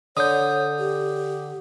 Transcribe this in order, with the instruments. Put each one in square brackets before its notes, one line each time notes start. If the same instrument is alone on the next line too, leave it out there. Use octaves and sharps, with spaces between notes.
[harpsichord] D3 [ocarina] C#5 [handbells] D#6 G6
[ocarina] G4